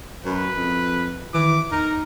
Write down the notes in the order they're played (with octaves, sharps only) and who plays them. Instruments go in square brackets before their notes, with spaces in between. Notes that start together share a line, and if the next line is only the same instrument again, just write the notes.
[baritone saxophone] F#2 [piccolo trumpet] B4
[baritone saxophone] F2
[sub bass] D#3 [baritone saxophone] E3 [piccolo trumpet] D6
[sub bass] E2 [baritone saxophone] D#4 [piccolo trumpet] A#4